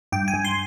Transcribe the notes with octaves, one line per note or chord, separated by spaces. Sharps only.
G2 G5
G#5
G2
C6